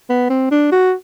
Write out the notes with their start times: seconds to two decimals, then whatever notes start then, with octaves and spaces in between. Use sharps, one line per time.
0.09 B3
0.30 C4
0.51 D4
0.72 F#4